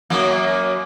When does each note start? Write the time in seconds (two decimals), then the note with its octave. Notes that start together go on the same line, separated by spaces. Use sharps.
0.10 F#2 F#3 A#3